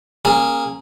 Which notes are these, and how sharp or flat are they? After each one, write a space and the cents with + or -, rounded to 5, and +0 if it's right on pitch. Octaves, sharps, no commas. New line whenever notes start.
A#3 +0 C#4 -30 G#4 +0